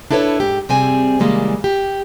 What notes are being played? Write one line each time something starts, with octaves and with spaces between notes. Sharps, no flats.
D4 E4 A4 B4 C#5
G#2 G4
C3 G3 C4 G#4 G#5
C#3 E3 G3 G#3 A#3
G4